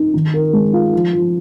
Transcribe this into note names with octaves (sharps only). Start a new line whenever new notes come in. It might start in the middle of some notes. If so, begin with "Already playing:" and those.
Already playing: D#4
D#3
A#4
G#3
F4
F3
F3